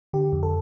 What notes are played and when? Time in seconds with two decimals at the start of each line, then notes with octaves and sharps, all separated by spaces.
0.13 D3 G4
0.33 F2
0.43 A4